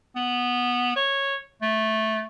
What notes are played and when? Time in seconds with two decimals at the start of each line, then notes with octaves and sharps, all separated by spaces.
0.15 B3
0.96 C#5
1.62 A3